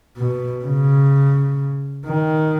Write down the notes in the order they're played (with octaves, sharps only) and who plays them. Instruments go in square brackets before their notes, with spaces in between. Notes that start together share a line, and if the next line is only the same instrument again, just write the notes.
[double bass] B2
C#3
D#3